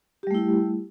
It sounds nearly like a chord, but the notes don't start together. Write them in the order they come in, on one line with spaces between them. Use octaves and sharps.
G4 G3 A3 E4